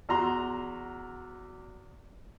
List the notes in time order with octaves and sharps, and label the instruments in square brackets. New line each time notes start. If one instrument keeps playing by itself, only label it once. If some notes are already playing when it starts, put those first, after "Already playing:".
[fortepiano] E2 F#4 A#5 C6